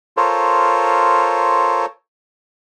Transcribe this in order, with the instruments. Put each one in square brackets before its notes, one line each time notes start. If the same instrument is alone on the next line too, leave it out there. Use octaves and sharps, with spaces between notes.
[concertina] F4 A4 A#4 C5 C#5